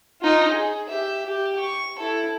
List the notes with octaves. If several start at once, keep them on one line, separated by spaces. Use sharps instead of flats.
D#4 F4
G#4
G4 E5
G4
C#6
E4 A4